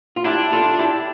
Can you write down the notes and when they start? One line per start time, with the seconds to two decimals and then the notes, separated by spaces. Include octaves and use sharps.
0.16 F4
0.25 D4 E4 G4
0.52 F4 A4
0.79 E4 G4